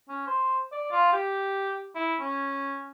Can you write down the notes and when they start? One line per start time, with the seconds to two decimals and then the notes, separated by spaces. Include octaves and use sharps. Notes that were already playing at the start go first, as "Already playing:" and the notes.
0.09 C#4
0.27 C5
0.72 D5
0.91 F4
1.13 G4
1.95 E4
2.20 C#4